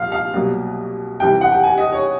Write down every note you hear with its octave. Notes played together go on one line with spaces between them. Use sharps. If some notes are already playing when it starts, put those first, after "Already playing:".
Already playing: C2 A#2 F3 A#3 F5
F5
C2 B2 F#3 A#3
C2 C3 E3 G5
F#5
G5
G#5
D#5
C#5